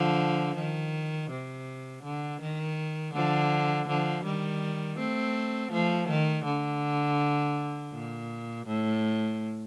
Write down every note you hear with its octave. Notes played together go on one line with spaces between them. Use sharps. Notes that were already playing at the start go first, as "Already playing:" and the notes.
Already playing: D3 F3
D#3
C3
D3
D#3
D3 F3
D3 F3
D#3 G3
A3 C4
F3 A3
D#3
D3
A#2
A2